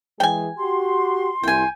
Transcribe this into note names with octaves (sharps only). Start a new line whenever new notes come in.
E3 G#3 G#4 G5 G#5
F#4 G4 C6
C2 E4 G5 G#5